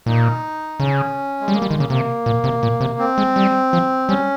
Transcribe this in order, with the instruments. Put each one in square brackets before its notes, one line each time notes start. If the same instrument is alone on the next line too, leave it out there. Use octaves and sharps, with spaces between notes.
[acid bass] A#2 [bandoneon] D#4
[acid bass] C#3 [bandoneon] C#4
[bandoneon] G#3
[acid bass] G3
[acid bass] G#3 [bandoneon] A#3
[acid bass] G3
[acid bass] D#3 [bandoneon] G#3
[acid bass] C#3 [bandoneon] A#3
[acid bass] C3 [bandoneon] A#3
[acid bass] A#2
C3
A#2
C3
[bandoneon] C4
[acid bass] G#3
G3
F3
[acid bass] G3 [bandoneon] C#4